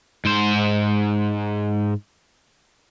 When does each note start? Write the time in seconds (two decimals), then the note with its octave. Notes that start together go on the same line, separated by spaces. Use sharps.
0.25 G#2 C5